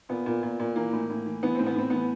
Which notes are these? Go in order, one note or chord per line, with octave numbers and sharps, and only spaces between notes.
A#2 B3
A#2
A#2
A#2
E3 A#3
A2
A2
E3
E3 B3
A2 C4
B3
A2 C4
E3 B3